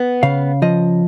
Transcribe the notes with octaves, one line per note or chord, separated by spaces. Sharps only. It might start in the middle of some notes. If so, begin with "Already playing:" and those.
Already playing: B3
C#3 F5
F3 D#5